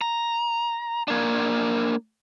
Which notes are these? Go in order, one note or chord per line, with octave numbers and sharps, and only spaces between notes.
A#5
A#3 D4